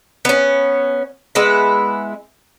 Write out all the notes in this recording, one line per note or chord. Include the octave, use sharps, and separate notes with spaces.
B3 C#4
G#3 B3 E4 E5